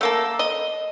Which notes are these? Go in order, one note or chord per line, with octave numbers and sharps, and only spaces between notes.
A3 A#3 A4
D#5